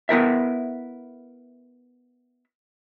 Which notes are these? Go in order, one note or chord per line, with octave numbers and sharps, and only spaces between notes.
B3 E4 A#4 E5